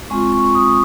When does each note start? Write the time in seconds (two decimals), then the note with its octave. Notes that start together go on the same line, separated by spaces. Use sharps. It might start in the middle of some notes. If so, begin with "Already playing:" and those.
0.10 G#3 C4 F4 C#6
0.32 C#6
0.55 D#6